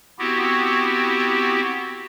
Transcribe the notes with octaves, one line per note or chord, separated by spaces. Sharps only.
B3 C4 E4 F#4 G4